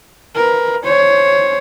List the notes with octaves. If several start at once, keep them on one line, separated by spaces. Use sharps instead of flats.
A#4 B4
C5 C#5